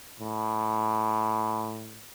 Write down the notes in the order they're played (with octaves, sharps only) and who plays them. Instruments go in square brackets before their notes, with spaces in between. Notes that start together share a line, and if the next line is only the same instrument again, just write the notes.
[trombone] A2